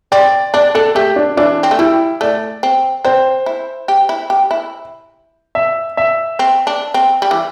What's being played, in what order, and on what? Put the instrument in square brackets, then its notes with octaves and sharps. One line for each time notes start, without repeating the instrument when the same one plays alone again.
[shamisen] C4 [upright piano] D5
[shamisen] D4 [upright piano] D5
[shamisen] D4 [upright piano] A4
[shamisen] A3 [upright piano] G4
[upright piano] D4
[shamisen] E3 [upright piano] D4
[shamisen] C4
A3
[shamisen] G3 [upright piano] E4
[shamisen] A3 [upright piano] D5
[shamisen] C4
[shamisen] C4 [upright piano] C5
[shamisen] E4
G4
E4
G4
E4
[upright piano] E5
E5
[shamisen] C4
D4
C4
G3
E3